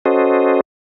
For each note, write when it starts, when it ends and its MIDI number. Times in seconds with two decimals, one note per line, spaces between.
0.06 0.61 61
0.06 0.61 66
0.06 0.61 69
0.06 0.61 72
0.06 0.61 75